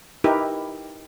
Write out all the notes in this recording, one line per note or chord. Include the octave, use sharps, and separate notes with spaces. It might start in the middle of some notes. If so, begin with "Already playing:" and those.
D#4 E4 G4 A#4 B4